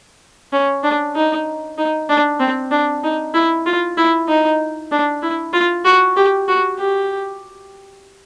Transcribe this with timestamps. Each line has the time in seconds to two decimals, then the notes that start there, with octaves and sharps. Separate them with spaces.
0.53 C#4
0.84 D4
1.15 D#4
1.78 D#4
2.09 D4
2.40 C4
2.71 D4
3.04 D#4
3.34 E4
3.66 F4
3.97 E4
4.29 D#4
4.92 D4
5.23 E4
5.53 F4
5.85 F#4
6.17 G4
6.48 F#4
6.78 G4